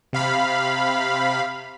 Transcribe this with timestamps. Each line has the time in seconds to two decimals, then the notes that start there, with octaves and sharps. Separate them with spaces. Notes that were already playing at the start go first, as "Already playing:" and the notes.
0.13 C3 F5 B5